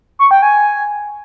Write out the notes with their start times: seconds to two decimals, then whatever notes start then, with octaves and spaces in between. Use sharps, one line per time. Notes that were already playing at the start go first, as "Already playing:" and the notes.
0.19 C#6
0.31 G5
0.42 G#5